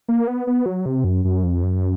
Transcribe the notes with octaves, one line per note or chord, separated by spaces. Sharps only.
A#3
B3
B3
F#3
C3
F#2
F#2
F2
F#2